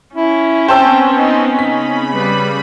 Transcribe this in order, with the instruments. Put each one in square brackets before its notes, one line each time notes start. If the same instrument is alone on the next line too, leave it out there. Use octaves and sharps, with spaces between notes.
[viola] C#4 [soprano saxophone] E4
[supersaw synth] B3 C4 [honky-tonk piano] C5 A5 E6 [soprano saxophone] G5
[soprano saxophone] D#4
[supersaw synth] C#3 B5 [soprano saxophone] D#4 [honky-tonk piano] B6
[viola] G3 [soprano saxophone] B4